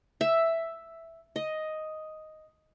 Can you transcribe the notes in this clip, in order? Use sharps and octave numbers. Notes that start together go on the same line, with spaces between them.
E5
D#5